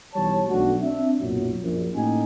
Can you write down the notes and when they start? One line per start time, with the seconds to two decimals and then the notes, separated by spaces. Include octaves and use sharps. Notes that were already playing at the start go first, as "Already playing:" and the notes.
0.14 B1 E3 G3 C#5 A5
0.49 B1 F#3 A3 D4 F#4
0.82 C4 D4 E5
1.20 B1 F#2 A#2 F#3
1.63 A#1 F#2
1.93 A2 A#3 C#4 D#4 G4 G#5